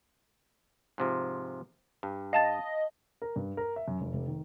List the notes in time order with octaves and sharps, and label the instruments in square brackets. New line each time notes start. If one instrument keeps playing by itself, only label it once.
[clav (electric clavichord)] G#2 C3 F3
G2
[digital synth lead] D#5 [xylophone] F5 A5 A6
[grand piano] A#4
G2
A#4
E5
F#2
F1
F1
D#3